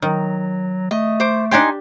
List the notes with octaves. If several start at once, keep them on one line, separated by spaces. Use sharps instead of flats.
D#3 F#3
A3 D#5
C5 D6
D4 D#4 G4 G#5 C6